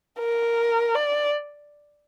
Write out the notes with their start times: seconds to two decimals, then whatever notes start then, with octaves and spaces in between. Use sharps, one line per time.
0.19 A#4
0.95 D5